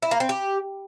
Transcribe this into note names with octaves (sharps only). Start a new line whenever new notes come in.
E4
A#3
C4
G4